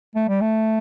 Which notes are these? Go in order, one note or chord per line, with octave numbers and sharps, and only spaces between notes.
A3
G3
A3